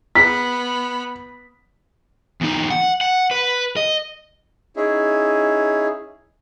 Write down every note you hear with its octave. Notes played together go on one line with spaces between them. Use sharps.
B3 B5 B6
E2 D#4
F#5
F#5
B4
D#5
C#4 D#4 E4 G#4